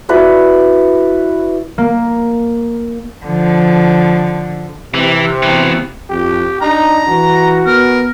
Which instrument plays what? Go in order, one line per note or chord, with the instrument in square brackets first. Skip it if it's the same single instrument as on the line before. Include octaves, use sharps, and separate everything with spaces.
[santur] E4 F#4 B4 D5
[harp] A#3
[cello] D3 F3
[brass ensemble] C3 [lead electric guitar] E3
[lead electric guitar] B2 E3
[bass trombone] F2 [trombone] G4
[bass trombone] D4 [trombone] D#4 [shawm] A#5
[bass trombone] E3 [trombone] F#4
[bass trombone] B3 [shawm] A#4